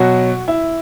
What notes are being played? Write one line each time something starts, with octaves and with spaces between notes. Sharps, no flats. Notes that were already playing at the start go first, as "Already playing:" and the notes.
Already playing: B2 F#3 F#4
E4